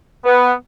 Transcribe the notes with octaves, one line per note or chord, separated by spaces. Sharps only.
B3